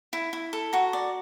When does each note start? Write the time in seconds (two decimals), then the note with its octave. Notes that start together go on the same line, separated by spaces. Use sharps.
0.13 E4
0.33 E4
0.53 A4
0.73 F#4 A#5
0.93 D5